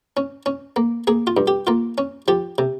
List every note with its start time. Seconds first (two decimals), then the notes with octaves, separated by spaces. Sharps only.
0.17 C#4
0.46 C#4
0.76 A#3
1.07 A#3 G#4
1.27 F4
1.37 G2
1.47 G4
1.67 A#3 F4
1.98 C#4
2.28 F3 G4
2.58 C3